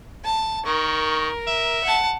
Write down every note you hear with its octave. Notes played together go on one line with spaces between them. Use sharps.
A5
D#3 A#4 C#6
E5
F#5 A5